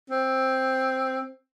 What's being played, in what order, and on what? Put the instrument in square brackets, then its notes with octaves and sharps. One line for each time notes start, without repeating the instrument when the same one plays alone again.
[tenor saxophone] C4